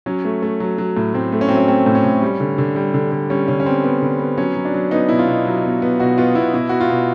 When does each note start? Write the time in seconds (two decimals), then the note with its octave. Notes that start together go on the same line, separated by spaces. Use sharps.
0.06 F#3 C#4
0.25 A3
0.43 A3
0.60 F#3
0.78 F#3
0.97 A2
1.14 A2 C4
1.32 A3
1.41 C#4
1.49 F#3 C4
1.57 C#4
1.68 A3 C4
1.86 A2
1.95 C#4
2.04 A2
2.22 G3
2.40 D3
2.58 D3
2.76 G3
2.94 D3
3.12 D3
3.30 G3 C#4
3.48 D3 C#4
3.60 C#4
3.66 B3 C4
3.84 B3
4.02 D3
4.20 B3
4.38 F#3 C#4
4.56 F#3
4.65 D4
4.74 F#3
4.91 B3 D#4
5.09 B2 E4
5.19 F4
5.27 B2
5.46 F#3
5.64 B2
5.82 B3
6.00 B2 F#4
6.18 B3 F4
6.35 B2 E4
6.54 B2 E4
6.69 B3 F#4
6.81 F4
6.90 B2